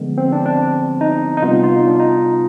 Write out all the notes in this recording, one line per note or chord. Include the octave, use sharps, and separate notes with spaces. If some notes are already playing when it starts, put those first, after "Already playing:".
Already playing: D3 F3 G#3 B3
C4
D4
D4
D#4
D#4
C3 G3 B3 F4
F4
D#4
D4
D#4